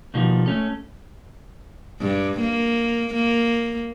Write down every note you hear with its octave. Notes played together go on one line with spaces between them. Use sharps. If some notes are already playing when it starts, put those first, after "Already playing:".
B2 D#3 F3 G3 A#3
A3 C#4 A4
G2
A#3
A#3